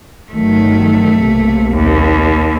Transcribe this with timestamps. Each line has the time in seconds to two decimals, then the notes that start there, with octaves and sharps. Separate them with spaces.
0.32 G1 D#3 F#3 A3
1.20 B1 C3 A#3
1.75 D#2